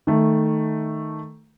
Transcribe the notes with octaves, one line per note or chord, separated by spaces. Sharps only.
D#3 A3